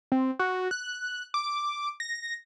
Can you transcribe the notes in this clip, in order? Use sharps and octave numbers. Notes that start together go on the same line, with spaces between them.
C4
F#4
F#6
D6
A#6